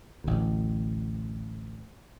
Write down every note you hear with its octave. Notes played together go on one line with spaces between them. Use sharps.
A1 D2